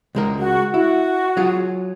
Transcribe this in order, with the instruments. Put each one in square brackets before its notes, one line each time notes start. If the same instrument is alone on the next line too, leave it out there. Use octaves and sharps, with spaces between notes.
[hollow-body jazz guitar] C#2 G#3 A#4
[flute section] F#4
[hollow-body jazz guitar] E4 [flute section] F#4
[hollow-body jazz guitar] F#3 F4 G#4